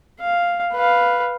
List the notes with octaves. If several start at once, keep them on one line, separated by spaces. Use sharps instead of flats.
F5
B4 F5